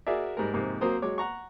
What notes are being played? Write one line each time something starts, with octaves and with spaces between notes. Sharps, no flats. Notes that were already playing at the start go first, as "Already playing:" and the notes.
F#4 G#4 A#4 D5 E5
G#2 G3 A#4
F2 G#2 C3 A#3
F#3 A#3 C4 A#4 C5 D#6
F#3 G#3 C#5 D6
F#5 A#5 C#6